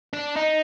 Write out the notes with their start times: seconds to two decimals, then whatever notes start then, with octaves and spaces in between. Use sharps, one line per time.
0.13 D4
0.36 D#4